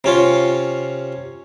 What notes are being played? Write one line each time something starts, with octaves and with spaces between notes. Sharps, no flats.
C3 C#4 F4